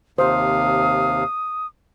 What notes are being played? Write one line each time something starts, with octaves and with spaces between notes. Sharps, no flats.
D#2 C3 C5 F5 D#6